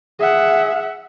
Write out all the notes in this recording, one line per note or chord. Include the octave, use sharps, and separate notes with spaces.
G#4 E5 F#5